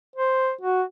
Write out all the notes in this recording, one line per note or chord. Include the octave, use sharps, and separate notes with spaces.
C5
F#4